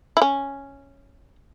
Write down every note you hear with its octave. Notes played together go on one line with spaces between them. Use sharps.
E4
C#4